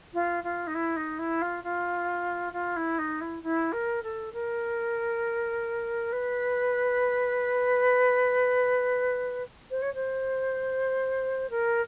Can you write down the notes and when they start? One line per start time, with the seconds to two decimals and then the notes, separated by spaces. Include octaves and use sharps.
0.14 F4
0.44 F4
0.67 D#4
0.74 E4
0.96 D#4
1.19 E4
1.42 F4
1.64 F4
2.53 F4
2.76 E4
2.98 D#4
3.21 E4
3.43 E4
3.72 A#4
4.03 A4
4.33 A#4
6.12 B4
9.71 C5
9.82 C#5
9.94 C5
11.50 A#4